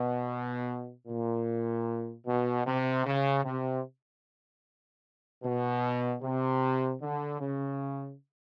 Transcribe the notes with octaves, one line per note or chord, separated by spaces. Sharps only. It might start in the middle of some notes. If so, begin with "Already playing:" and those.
Already playing: B2
A#2
B2
C3
C#3
C3
B2
C3
D3
C#3